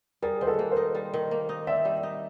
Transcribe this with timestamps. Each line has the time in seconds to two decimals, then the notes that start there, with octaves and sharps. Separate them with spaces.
0.22 G3 G#4 A#4
0.41 D#3 C5
0.47 A4 B4
0.59 A#3
0.71 A#4 C5
0.77 D#4
0.95 G3
1.14 D#3
1.31 A#3
1.49 D#4
1.67 C4 D5 E5
1.85 G3
2.03 D#4